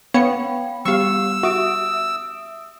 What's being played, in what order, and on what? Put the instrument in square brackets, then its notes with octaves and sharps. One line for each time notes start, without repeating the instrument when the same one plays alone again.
[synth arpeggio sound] B3 C#5 C#7 [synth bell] F5 G5 B5
[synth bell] G3 B3 G4 [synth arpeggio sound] F5 C#6 [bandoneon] E6
[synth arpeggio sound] F#4 [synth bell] E5 D#6 D7